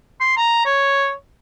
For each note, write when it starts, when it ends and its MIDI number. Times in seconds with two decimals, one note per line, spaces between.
0.21 0.37 84
0.37 0.64 82
0.66 1.12 73